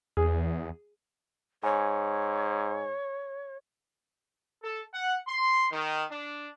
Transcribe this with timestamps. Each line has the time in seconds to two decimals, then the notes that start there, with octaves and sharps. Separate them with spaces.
0.17 E2 G#4
1.64 G#2 C#5 G#5
4.63 A4
4.94 F#5
5.28 C6
5.72 D#3
6.11 D4